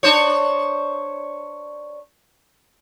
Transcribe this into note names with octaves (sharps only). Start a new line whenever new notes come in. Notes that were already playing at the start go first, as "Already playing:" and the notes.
D4 C5 C#5